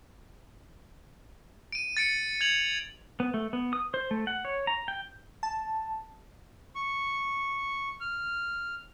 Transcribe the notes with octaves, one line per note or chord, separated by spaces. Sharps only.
D7 D#7
A6 C#7 D7
G#6 F7 F#7
B3
A3
B3
D#6
C5
A3
F#5
C#5
A#5
G5
A5
C#6
F6